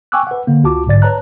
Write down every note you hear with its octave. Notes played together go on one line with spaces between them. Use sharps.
G5 G#5 C#6 D6 E6 F#6
B4 F#5
D3 A#3
C#2 F4 F#4 A5 D6
B1 G#2 D3 D5 A6
B4 C#5 A5 A#5 F#6